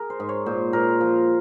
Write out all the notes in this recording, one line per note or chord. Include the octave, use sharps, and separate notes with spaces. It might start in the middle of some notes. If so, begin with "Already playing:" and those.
Already playing: G#4 A#4
C5
G#2
C#5
A#2 C5
A#2 A#4
F3 C5